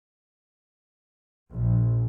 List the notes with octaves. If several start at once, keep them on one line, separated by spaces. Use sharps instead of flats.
A#1